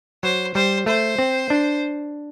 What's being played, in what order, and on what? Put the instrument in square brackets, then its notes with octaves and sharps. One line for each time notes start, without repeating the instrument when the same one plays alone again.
[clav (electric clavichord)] F#3 [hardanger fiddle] C5
[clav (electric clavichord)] G3 [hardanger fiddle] C5
[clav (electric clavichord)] A3 [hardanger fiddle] C5
[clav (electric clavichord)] C4
D4